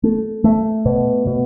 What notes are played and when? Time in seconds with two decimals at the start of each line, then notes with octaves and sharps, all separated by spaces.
0.03 A3
0.44 A3
0.86 B2
1.27 B2